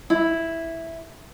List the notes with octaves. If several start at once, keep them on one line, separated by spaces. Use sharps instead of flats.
E4